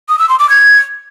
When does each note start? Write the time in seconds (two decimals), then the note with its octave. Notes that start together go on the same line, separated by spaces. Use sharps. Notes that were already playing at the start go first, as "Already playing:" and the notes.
0.09 D#6
0.19 E6
0.29 C6
0.39 D6
0.49 G#6